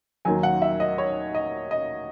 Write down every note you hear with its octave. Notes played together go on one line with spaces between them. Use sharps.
D#2 D#3 F#3 G#5
F#5
E5
D#5
C#5
D#5
D#5